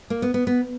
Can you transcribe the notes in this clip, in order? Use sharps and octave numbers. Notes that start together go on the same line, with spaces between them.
A#3
B3
B3
B3